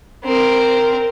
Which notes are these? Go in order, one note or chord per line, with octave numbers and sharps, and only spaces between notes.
C4 A#4